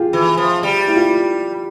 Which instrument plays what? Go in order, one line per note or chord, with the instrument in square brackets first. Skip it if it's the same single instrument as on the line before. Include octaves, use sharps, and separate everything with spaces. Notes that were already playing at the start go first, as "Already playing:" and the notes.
Already playing: [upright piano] F4 G4 G#4
[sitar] E3
F3
G3
[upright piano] E4
F4
E4